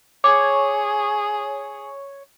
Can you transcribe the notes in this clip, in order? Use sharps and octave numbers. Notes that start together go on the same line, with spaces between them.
G#4 C#5 D6